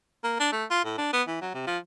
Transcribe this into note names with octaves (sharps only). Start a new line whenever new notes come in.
A#3
D4
A3
F4
A2
D4
B3
E3
F#3
C3
F3